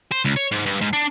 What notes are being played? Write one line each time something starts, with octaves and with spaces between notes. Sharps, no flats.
C5
C#2
C#5
G#2
G2
G#2
D4